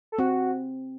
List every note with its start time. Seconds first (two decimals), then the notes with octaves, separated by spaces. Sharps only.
0.12 A4
0.19 C4 F#4